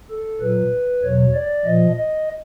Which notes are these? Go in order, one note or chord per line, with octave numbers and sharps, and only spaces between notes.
A4
A#2 F#3 B4
E2 B2 F#3 C#5
D5
A#2 F3 D#5
D#5